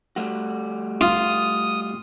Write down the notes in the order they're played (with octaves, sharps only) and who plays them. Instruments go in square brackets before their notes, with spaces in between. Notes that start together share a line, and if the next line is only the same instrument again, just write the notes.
[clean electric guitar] G3 A3 F#4
[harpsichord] F4 [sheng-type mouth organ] D#6